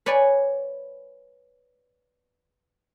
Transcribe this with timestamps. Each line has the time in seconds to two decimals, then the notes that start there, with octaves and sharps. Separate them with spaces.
0.06 B4 C#5 D5 G#5